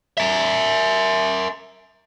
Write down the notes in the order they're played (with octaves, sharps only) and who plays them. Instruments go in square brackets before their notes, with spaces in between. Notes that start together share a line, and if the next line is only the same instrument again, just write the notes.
[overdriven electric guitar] A#4 E5